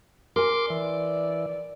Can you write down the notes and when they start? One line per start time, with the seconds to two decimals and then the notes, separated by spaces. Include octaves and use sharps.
0.36 A#4 G#5 C6 D6
0.70 E3 D5